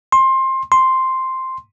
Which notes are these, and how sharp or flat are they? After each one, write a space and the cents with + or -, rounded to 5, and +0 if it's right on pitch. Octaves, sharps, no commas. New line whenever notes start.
C6 +20
C6 +0